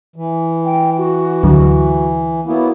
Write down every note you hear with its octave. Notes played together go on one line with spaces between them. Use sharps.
E3
G5
F#4
D2 D3 F#3
F#3 A#3 B3 E4